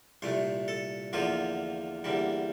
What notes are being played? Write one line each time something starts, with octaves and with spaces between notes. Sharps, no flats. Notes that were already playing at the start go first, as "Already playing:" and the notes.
C2 A#2 A3 C5
A4
E2 D3 F3 A#3 F4
E2 D3 G3 A#3